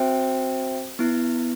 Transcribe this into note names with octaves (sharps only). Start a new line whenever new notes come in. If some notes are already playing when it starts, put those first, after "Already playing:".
Already playing: C4 F#4 C5 E5 G5
B3 E4